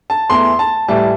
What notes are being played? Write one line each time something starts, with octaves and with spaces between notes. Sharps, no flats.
A5
E2 E3 A3 C6
A5
A2 E3 G3 A5